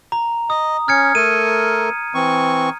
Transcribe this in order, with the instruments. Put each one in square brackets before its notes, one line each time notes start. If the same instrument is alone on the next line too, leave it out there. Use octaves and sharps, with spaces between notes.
[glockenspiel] A#5
[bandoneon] D#5 [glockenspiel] D#6
[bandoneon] C#4 [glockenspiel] F6 G#6 C#7
[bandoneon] A3 A4 A#4 [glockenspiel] D#7
[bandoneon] E3 C4 C#6